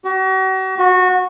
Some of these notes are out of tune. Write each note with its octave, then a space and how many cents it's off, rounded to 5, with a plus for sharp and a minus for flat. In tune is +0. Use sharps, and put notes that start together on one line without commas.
F#4 +40
F#4 -20